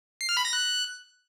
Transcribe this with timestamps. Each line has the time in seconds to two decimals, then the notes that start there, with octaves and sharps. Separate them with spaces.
0.21 C7
0.29 F6
0.37 B5
0.45 A#6
0.53 F#6